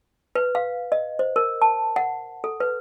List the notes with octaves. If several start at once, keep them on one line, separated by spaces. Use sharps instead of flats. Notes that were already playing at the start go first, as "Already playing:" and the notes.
B4
F5
D#5
C5
A#4
A5
F#5
A4
B4